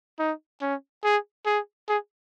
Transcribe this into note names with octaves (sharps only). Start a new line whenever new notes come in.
D#4
C#4
G#4
G#4
G#4